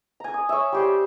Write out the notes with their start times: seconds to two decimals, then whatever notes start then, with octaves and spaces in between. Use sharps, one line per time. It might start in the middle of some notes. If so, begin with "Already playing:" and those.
0.20 G#5 A#5
0.34 D#6
0.49 C#5 E5
0.72 G3 G4 C5